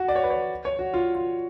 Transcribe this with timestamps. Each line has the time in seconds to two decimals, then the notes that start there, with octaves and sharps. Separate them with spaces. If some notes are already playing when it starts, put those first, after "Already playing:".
Already playing: F#4
0.08 D5
0.16 C#5
0.23 B4
0.30 C#5
0.65 C#5
0.79 F#4
0.94 F4
1.15 F4